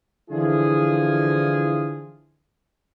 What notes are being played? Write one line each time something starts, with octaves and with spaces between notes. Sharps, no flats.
D3 E3 F3 E4 F4 G#4